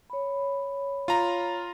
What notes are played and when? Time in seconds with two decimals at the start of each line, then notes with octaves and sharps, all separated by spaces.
0.10 C#5 B5
1.08 F4 A#5